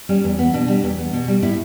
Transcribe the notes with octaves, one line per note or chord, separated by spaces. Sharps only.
G3 C#4
E2
B3
B2 D4
G3
E2
B3
B2
G3
A2 E4